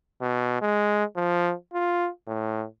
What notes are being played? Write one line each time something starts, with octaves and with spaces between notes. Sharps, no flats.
B2
G#3
F3
F4
A2